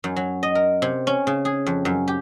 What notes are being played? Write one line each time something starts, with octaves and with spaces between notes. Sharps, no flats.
F#2
F#3
D#5
A#4
C3
C#4
C#3
G#4
F2
F#2
G4